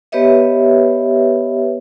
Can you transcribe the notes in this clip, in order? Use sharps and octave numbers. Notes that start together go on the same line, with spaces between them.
B3 G4 B4 C#5 D#5 E5